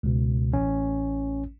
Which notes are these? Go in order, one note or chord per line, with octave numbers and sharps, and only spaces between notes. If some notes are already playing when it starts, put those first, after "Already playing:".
C#2 B2
A1 C#4